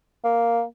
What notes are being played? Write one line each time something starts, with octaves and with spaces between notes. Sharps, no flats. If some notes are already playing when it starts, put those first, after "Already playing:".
A#3